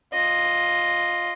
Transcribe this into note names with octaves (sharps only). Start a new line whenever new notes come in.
F4 D#5